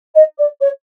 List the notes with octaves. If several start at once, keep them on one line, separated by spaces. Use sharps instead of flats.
D#5
D5
C#5